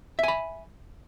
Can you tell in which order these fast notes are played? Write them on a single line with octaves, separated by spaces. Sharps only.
E5 G#5 B5